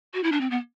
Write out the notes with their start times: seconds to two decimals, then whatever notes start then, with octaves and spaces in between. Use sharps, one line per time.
0.14 F#4
0.23 E4
0.32 D4
0.41 C4
0.51 B3